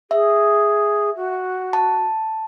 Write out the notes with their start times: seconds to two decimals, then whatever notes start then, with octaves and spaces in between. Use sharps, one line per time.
0.11 G#4 E5
1.16 F#4
1.73 A5